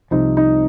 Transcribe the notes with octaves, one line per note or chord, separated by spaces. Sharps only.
C2 C3 F3 D#4
D#4